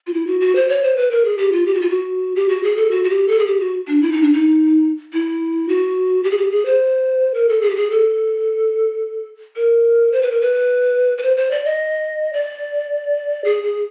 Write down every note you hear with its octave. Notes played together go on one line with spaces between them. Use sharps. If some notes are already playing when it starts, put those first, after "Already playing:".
F4
E4
F#4
F#4
C5
C#5
C5
B4
A#4
G#4
G4
F4
G4
F#4
F4
F#4
G4
F#4
G#4
A4
F#4
F#4
G4
A4
G#4
G4
F#4
D4
E4
D#4
D4
D#4
E4
F#4
G4
G#4
G4
G#4
C5
A#4
A4
G#4
G4
G#4
A4
A#4
C5
B4
A#4
B4
B4
C5
C5
D5
D#5
D5
G#4
G#4